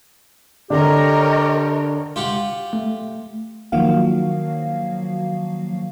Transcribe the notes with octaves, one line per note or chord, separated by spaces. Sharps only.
D3 G4 A#4 C#5 D#5
F4 G4 F#5
A3
D#3 F3 F#3 A#3 F#4 F5